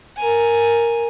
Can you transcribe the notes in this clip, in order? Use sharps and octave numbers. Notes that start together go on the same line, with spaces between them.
A#4 G#5